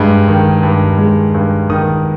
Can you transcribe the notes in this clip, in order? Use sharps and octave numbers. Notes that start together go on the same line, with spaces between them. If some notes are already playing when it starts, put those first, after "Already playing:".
Already playing: G2 G#3
D#3
G2
G#3
G2
D#3 D#6